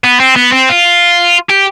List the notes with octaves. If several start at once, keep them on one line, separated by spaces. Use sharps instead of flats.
B3
C4
B3
C4
F4
G4